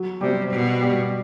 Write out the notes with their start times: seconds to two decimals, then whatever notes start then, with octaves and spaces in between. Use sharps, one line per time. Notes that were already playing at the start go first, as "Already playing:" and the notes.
Already playing: F#3
0.21 C3 G3
0.51 B2
0.81 G3